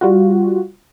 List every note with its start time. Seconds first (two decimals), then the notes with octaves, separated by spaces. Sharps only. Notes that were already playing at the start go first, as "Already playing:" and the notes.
0.01 G3 F4 F#4